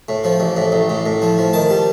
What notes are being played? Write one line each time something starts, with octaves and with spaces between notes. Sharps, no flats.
A2
F3
A1
A2
A1
A2
A2
F3
F3
D#3 A5
G3